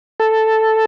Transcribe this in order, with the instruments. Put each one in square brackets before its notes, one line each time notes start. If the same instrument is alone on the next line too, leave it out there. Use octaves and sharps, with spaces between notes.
[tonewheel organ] A4